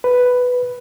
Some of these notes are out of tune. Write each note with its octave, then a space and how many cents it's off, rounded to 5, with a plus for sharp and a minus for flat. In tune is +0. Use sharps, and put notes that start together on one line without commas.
B4 +5